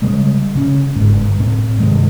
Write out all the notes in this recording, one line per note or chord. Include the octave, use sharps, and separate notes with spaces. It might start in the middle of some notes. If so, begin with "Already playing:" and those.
C#3 G3 G#3
C#3 C#4
G1 G#2
A2 C4
G2 C3 D#3 G#3